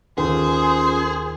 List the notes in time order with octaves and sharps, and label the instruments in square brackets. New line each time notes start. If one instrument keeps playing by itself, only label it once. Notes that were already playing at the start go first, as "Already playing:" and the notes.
[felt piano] D#2 [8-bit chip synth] C#4 F4 A4 [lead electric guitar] G#4 [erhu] C5